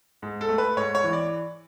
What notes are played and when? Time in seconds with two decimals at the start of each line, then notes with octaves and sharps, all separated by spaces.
0.22 G#2
0.41 A4
0.49 A3
0.58 B4
0.77 G#2 C#5
0.95 C#5
1.04 E3
1.13 D5